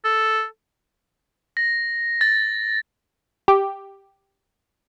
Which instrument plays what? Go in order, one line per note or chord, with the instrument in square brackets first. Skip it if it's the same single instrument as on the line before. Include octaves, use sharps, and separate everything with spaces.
[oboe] A4
[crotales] A#6
A6
[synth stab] G4